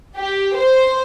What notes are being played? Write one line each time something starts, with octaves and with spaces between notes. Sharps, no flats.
G4
C5